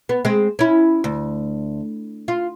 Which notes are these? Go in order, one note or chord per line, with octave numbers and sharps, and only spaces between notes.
B3
G#3 C4
C#4 E4
D2
F4